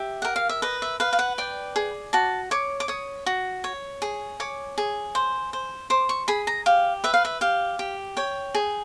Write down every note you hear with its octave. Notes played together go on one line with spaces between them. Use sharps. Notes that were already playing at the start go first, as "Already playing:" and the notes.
Already playing: G4 E5
A#4 F#5
F5
E5
B4 D#5
E5
B4 F5
F5
F#5
D5 G5
G#4
F#4 A5
C#5 D6
D6
C#5 D#6
F#4
C#5
G#4
C#5 D6
G#4
C5
C5
C5 D6
C#6
G#4 B5
A#5
G4 F5
B4 E5
F5
E5
G4 F5
G4
C#5 G5
G#4